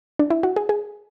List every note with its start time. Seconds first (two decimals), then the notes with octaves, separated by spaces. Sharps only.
0.19 D4
0.30 E4
0.43 F#4
0.56 G#4
0.69 G#4